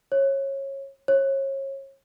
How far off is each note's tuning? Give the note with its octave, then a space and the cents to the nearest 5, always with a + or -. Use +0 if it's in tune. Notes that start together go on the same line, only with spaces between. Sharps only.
C#5 -25
C#5 -35